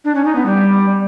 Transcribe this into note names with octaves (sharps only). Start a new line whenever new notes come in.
D4
C#4
D#4
B3
G3